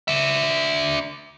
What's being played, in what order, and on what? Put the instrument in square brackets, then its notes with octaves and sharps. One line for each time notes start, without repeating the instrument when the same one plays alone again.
[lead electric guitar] D4 E5